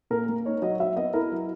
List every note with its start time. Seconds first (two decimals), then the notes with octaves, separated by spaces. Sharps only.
0.10 A#2 A#4
0.29 A#3
0.45 D#4 C#5
0.62 F#3 D#5
0.79 F#3 E5
0.97 B3 D#5
1.14 E4 A#4
1.32 F#3